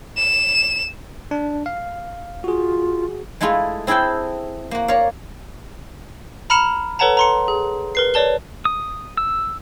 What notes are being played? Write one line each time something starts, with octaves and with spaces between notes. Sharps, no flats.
E7
D4
F5
F4 F#4 G#4
G#3 A3 E4 F4 G#4
C4 E4 G#4 A4 G5
A#3 F#4
A#4 C#5 D5 F5
A#5 B5 F6 C#7 E7 F7
A4 B4 C#5 F#5 A5 A#5
A#5 C6 C#7
G#4
A#4 B4 C7
B4 C#5 D5 A5 G7
D#6
E6